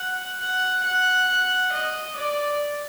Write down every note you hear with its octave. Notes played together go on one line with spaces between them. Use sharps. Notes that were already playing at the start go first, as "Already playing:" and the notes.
Already playing: F#5
F#5
F#5
F#5
D#5
D5